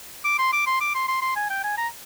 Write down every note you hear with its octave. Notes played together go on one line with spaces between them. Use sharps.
D6
C6
D6
C6
D6
C6
C6
C6
G#5
G5
G#5
A#5